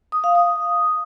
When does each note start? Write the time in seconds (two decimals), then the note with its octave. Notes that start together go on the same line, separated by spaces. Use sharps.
0.12 D#6
0.24 F5
0.35 D#6